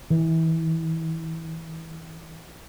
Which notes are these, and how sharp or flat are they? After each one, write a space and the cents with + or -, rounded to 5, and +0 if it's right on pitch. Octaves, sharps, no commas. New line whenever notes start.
E3 -25